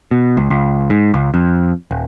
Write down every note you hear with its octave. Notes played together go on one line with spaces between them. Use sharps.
B2
C#2
C#2
G#2
C#2
F2
D#1